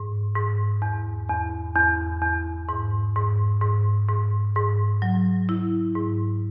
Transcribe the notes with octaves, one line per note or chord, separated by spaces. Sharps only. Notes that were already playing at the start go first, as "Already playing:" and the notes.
Already playing: G#2
G#2
E2
E2
E2
E2
G#2
G#2
G#2
G#2
G#2
F#3
E4
G#2